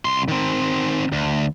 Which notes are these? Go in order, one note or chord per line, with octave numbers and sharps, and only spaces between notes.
C2 C6
D#3 C4
D2